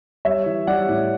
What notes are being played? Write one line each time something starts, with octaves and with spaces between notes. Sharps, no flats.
G3 C#5 E5
E3
G3 D5 F#5
A2